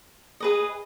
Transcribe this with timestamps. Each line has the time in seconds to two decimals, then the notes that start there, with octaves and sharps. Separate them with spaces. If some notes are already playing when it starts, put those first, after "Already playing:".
0.40 G#4 B4 D#5